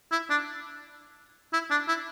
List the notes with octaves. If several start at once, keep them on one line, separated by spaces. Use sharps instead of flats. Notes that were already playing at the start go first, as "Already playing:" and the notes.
E4
D4
E4
D4
E4